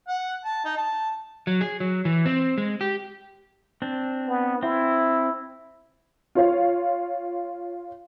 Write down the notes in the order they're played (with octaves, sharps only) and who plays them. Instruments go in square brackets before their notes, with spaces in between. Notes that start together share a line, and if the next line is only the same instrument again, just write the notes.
[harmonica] F#5
A5
D#4
A5
[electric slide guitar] F#3
G#4
F#3
E3
C4
G#3
G4
[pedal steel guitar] C4 D4
[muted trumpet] B3
[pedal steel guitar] C4 [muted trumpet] E4
[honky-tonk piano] F4 C#5 F5